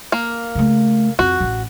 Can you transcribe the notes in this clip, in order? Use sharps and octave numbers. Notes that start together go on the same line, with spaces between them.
A#3
C#3 A3
F2 F#4
A1